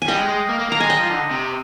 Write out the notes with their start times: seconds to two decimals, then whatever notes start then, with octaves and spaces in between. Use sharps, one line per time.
0.02 G#5
0.08 G3 D#5 G5
0.18 G#3
0.28 G#3
0.49 A#3
0.59 A#3
0.70 A#3 A#5
0.80 G#3 G#5
0.90 D#5 G5
1.00 F3
1.10 D3
1.31 C3